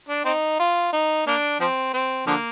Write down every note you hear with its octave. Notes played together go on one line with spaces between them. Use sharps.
D4
C4 D#4
F4
D#4
A#3 D4
F3 C4
C4
D3 F3 A#3